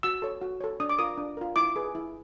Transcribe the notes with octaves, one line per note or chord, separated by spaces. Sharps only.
F#4 E6
A4 C#5
F#4
A4 C#5
D4 D#6
D6
F4 A#4 D#6
D4
F4 A#4
E4 D6
G#4 B4
E4